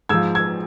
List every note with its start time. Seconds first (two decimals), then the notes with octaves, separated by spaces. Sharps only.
0.09 G#2 F3 E6 G#6
0.35 E6 G#6